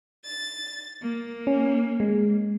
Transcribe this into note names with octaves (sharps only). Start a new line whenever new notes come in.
A6
A#3
C#4
G#3